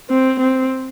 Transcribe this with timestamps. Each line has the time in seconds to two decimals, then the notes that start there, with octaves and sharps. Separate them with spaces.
0.10 C4
0.39 C4